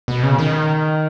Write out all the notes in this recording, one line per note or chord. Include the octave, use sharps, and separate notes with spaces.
B2
C#3
D#3